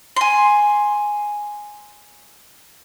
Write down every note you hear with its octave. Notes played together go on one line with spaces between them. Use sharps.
G#5 C6